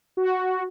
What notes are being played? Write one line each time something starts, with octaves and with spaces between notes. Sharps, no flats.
F#4